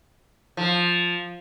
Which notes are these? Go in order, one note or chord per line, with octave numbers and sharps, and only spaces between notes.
F3